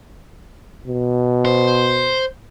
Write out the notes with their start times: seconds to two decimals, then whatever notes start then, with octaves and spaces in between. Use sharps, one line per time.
0.87 B2
1.45 C5